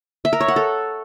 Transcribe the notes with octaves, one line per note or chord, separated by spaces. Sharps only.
E5
A#4
C#5
F#5
A4